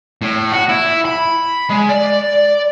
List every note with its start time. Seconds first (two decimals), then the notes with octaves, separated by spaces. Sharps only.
0.22 A2
0.52 F#4
0.69 E4
1.05 B5
1.70 G#3
1.89 D5